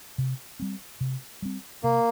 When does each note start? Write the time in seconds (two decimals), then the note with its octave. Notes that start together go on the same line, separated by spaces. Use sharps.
0.18 C3
0.60 G3 C4
1.01 C3
1.42 G3 C4
1.83 C3 A#3